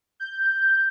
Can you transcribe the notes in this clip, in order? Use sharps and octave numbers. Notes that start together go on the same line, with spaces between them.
G6